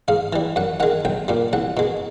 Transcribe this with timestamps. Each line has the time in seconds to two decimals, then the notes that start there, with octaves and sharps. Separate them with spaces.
0.08 G#2 F5
0.33 E3 G3
0.56 F#2 F#5
0.80 D#3 F#5
0.83 G#3
1.05 B1 G5
1.28 A#2 G3
1.53 C2 F#5
1.77 B2 G#3